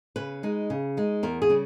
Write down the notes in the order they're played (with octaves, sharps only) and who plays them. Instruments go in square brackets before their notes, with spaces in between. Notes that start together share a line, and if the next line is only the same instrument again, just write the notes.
[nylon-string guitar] C#3 B4
G#3 D#4
C#3
G#3 D#4
E2 A#4
G#4
C#3 G3